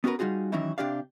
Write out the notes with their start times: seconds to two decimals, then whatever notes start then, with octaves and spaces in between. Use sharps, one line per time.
0.04 B3 C#4 F#4 G#4 A#4 B4
0.19 G3 D#4 F4 F#4 G#4
0.52 D#3 E3 F#3 C#4 D#4 E4
0.78 C3 D4 G4 D5 F5